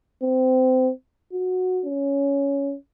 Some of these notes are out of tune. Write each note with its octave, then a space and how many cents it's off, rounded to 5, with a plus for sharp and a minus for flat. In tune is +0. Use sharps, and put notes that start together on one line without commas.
C4 -25
F#4 -10
C#4 +10